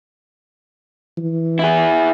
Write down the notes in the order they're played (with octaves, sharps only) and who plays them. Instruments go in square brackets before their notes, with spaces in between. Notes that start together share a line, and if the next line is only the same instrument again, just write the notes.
[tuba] E3
[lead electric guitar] E4 G#4